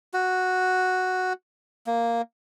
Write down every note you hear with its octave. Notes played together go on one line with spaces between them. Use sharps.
F#4
A#3